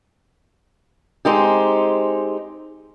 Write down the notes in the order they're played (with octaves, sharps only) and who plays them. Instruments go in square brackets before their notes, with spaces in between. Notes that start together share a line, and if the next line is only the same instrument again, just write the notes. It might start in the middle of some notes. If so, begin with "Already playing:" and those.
[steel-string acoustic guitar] G#3 C4 D#4 G4